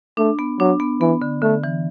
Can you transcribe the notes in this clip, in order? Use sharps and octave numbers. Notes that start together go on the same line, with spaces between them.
A3 D4
B3
F#3 D4
B3
E3 B3
D3
D3 A3
E3